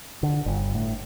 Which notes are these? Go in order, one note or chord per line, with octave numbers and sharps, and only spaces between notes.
D3
G1
A2